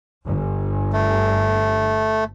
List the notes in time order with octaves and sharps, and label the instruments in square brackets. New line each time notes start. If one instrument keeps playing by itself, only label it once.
[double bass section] G1
[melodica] A3